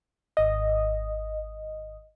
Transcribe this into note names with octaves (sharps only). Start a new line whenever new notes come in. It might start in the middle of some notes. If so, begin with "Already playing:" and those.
G#1 D#5